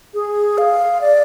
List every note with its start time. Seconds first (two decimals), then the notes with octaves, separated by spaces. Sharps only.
0.14 G#4
0.58 F5
1.01 D5